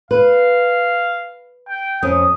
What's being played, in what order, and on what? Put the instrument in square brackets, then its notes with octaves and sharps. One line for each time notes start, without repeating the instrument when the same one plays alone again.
[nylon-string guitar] B4 [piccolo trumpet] F5
[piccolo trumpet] G5
[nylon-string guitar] F2 C#4 [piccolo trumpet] D#6